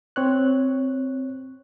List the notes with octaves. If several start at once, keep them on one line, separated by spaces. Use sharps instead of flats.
C4 C#5 F#6